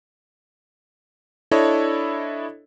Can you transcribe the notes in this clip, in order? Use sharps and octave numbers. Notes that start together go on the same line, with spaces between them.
D4 E4 A4 C#5 D#5